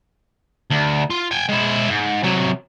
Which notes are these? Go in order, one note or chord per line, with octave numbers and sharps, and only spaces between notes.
D2
F4
G5 G#5
G#3 E4
G#2
C3 F#3